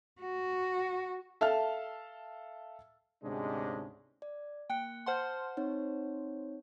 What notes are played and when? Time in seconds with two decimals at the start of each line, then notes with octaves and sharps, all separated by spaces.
0.21 F#4
1.41 A4 E5 F5 A5 F6
3.23 D2 G#2 C3 G#3 C#4 D4
4.22 D5
4.70 A#3 G5 F#6 C#7
5.06 C5 F#5 A5 C6 F6 G6
5.57 C4 D#4 C#5